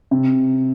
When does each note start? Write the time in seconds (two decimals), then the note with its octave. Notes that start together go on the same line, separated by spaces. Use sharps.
0.11 C3